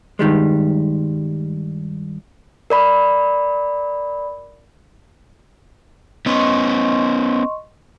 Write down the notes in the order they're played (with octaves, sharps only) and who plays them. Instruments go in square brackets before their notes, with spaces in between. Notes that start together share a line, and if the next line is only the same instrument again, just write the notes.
[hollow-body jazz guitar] G2 D#3 G3 G#3
[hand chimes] A#4 D5 B5
[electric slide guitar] B3 C#4 [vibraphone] D#5 C6 C#6